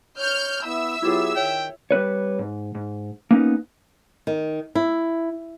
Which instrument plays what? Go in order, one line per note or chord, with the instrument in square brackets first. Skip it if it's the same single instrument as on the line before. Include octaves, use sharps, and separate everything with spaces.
[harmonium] C#5 [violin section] F6 G6
[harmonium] B3 E4 [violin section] E5 E6
[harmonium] F#3 B3 G4 [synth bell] E4 F4 G#4
[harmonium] D#3 [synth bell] C#5 [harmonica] G5
[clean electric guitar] G3 C4 B4 C#5
G#2
G#2
A#3 B3 C#4 D#4
[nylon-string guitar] D#3
E4